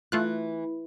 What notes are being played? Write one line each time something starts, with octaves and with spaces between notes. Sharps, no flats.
E3 A3 F4 F#6